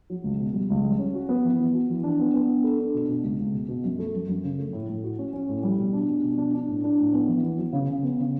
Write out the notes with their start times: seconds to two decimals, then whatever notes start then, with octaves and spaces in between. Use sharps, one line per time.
0.10 F#3
0.24 C#2
0.39 B2
0.54 G3
0.70 C#2
0.84 G3
0.99 C#4
1.14 F#4
1.29 B3
1.44 E3
1.59 B3
1.74 F#4
1.89 E3
2.03 D4
2.19 B3
2.34 B3
2.49 D4
2.64 A4
2.79 D4
2.94 B2
3.09 B2
3.23 C#2
3.39 C#2
3.53 B2
3.68 B2
3.84 F#2
3.99 A3
4.14 F#2
4.28 F#2
4.44 C#3
4.58 A3
4.73 A2
4.88 A2
5.04 F#4
5.19 C#4
5.33 C#4
5.49 A2
5.63 G3
5.78 B2
5.93 D4
6.09 B2
6.23 B2
6.38 D4
6.54 D4
6.68 A2
6.84 D4
6.99 A2
7.13 B3
7.28 E3
7.43 B3
7.58 F#3
7.73 C#3
7.89 C#3
8.03 B3
8.19 C#3